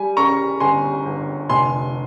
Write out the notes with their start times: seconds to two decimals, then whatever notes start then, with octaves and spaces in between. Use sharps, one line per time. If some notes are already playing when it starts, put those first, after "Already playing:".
Already playing: G3 G#5
0.17 C#3 A#5 C#6
0.60 G1 G#5 C6
1.06 G1
1.49 F1 G#5 C6